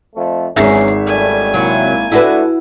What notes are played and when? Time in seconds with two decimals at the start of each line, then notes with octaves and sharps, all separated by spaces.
0.16 F2 A3
0.56 G#1 E3 F#3 C#4 D#4 G#4 E5 C7
1.07 C#2 G3 A3 G#5
1.53 C3 F#3 A#3 E4
2.12 A3 D4 E4 F#4 B4